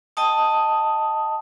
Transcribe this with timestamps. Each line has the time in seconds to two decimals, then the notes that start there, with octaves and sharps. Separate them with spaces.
0.17 D#5 G5 A5 D#6